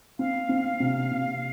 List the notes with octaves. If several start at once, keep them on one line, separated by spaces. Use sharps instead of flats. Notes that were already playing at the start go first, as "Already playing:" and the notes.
C4 F5
C4
C3
C3